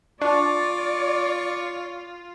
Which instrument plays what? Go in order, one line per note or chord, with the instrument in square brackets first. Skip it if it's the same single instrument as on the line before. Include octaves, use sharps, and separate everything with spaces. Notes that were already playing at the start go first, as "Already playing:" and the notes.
[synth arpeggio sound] D4 [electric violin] F4 [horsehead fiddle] D5 [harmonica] C#6 D6